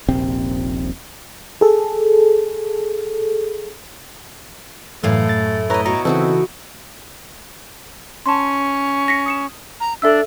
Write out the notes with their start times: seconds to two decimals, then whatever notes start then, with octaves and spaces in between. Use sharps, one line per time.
0.09 D#1 A#1 C3 C4
1.61 G#4 A4
5.04 F#2 A2 E3 A3 F5
5.29 A6
5.70 E4 B4 C#5 D#5 A#5
5.86 B2 C#5 A#5
6.05 C#3 E3 C4 D#4 E4 F#4 A4
8.26 C#4 A5 C6
9.08 A#6 B6 C#7
9.26 D#6 C#7 E7
9.80 A#5
10.02 D4 A4 E5 E6